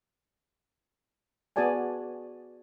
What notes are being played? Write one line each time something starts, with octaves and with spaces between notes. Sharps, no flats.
B3 F#4 G#4 D5 G#5 A5